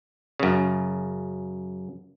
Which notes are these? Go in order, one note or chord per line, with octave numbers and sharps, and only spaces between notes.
F#2 C#3